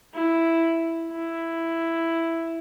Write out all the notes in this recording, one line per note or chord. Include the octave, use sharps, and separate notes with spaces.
E4
E4